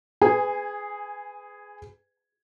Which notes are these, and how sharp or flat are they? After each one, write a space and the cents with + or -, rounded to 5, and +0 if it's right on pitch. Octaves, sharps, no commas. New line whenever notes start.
G#4 +0 B4 +30 G#5 -25